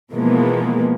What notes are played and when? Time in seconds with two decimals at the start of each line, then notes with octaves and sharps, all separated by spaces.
0.12 B2 E3 F3 G#3 A#3 B3